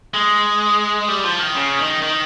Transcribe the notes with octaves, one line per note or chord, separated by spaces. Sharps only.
G#3
G3
F3
D#3
C#3
D#3
D#3